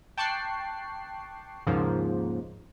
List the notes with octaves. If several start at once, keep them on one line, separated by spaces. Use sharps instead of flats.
G5 A5 C#6 D6 F#6 C7
D#2 G#2 C#3 F3 A#3